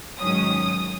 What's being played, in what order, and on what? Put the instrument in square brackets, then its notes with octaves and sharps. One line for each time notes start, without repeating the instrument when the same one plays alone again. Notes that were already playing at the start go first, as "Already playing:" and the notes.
[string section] G#2 D#3 F#3 C#4 D#6